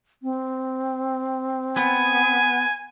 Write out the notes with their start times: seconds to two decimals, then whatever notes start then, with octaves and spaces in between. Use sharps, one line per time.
0.23 C4
1.77 B3 G#5